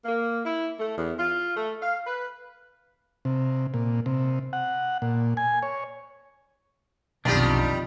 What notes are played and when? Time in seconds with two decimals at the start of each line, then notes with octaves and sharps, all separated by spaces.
0.05 A#3
0.44 E4
0.78 A3
0.96 E2
1.18 F4
1.55 A3
1.81 F5
2.05 B4
3.25 C3
3.74 A#2
4.06 C3
4.53 F#5
5.02 A#2
5.37 G#5
5.63 C#5
7.25 B1 F2 C3 D#3 G3 D4 F4 G4